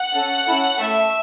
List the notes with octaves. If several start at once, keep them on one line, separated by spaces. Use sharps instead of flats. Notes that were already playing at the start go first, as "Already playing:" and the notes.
Already playing: F#5
C#4 A4
C#4 E4 A4
A3 E4 A4 E5